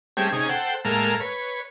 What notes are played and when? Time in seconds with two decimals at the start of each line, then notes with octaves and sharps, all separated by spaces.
0.17 G3 A3 C4 C#4 G4 G#4
0.32 C3 C#4 D#4 G#4
0.49 A4 C5 F#5 G5
0.85 A2 G#3 A#3 A4 A#4 F5
1.20 B4 C#5